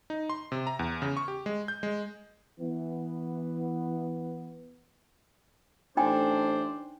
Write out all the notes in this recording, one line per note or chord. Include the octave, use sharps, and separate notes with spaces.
D#4
C6
C3
A#5
E2
C#3
C#6
G4
G#3
G6
G#3
E3 B3
A1 A3 D4 D#4 C5 G5 G#5